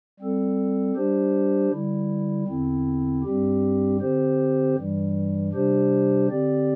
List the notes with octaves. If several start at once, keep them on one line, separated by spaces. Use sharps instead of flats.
G3 C4 A4
G3 D4 G4 C5
D3 G3 E4
E2 D3 C4 E4
G2 G3 C4 G4
D3 C4 G4 C5
G2 E3 G3
C3 G3 D4 G4 C5
D3 C4 G4 D5